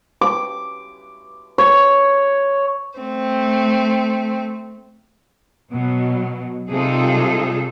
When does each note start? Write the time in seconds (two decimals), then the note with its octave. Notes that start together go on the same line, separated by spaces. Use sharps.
0.21 D6
1.58 C#5
2.99 A3 C4
5.72 B2 F#3
6.71 C3 G3 D#4 F4 G#4 A4